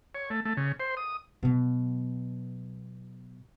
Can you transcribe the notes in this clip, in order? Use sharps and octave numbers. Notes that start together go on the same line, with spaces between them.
C#5
A3
A3
C#3
C5
D#6
B2 F#3